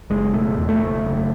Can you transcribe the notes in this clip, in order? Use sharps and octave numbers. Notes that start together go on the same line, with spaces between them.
F#1 G#3
B2 A3
E2
A3
F#1
F#1